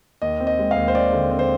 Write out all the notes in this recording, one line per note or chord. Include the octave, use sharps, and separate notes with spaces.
D#2 D#5
C4
D#5
G#3
D#2 F5
C5
C4 D5
D3
C4
C5